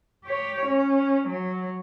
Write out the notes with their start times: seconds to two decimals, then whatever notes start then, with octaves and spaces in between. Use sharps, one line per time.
0.25 G4 C#5
0.66 C#4
1.29 F#3